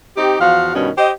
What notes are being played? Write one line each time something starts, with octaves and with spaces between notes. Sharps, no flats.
C4 D#4 G4
E2 F3 F#4 F5
G2 B2 D#3 C#4
G4 C5 D#5